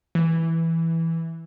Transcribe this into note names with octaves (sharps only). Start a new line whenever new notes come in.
E3